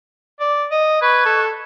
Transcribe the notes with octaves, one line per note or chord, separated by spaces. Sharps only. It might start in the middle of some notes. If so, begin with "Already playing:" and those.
D5
D#5
B4 C#6 F#6 G#6
A4